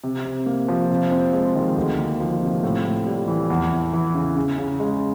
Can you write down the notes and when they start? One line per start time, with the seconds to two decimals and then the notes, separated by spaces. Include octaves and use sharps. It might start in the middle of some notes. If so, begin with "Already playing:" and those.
0.04 C3
0.25 C3
0.46 A#3
0.68 F3
0.90 C3
1.11 C4
1.33 G#3
1.55 D#3
1.76 D2
1.98 A#3
2.20 F3
2.41 C3
2.63 A2
2.84 A2
3.06 G3
3.28 E3
3.50 E2
3.71 E2
3.93 E3
4.15 C#3
4.36 C#3
4.58 C#3
4.80 G#3